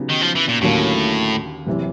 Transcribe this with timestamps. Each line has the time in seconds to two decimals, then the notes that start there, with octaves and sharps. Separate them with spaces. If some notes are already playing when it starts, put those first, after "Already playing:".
Already playing: C#3 F#3 B3 D#4 G4
0.10 D#3
0.22 F3
0.36 E3
0.48 A#2
0.61 D#2 A2 D3 F#3 A#3 C#4
1.67 F#1 C3 E3